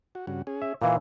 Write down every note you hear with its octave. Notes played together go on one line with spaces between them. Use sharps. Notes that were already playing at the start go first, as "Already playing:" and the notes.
F#4
G2 C#3 F#4
C#4 G#4
E5
A#2 E3 D#4 F5